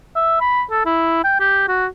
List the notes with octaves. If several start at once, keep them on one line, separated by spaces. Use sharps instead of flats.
E5
B5
A4
E4
G5
G4
F#4